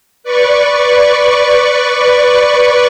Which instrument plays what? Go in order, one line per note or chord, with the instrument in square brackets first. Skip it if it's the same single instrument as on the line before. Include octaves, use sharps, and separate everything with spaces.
[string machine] B4 D5 C#6